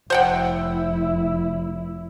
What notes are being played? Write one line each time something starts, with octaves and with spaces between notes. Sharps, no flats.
F1 E4 C5 F#5 G5